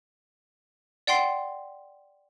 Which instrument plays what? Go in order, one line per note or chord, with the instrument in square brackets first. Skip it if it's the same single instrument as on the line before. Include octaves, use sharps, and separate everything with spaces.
[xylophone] D5 F#5 G5 C6 C7